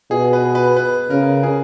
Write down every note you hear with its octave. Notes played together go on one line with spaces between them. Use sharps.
B2 G#4
B4
B4
B4
C#3 A#4
G#4